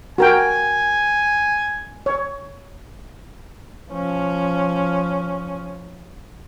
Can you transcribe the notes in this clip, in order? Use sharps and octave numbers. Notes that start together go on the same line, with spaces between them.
F#4 A#4 G5 G#5
C#5
F3 C#4